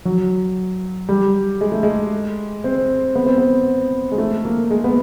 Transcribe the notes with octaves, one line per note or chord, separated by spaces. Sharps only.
F#3
G3
G#3
A3
G#3
C4
B3
C4
B3
G#3
A3
A#3
G#3
B3